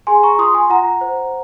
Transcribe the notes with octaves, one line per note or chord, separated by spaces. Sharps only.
G#4 G#5 C6
A#5 C#6
F4 C6 D#6
G#5 C6
F4 F#5 A#5
C5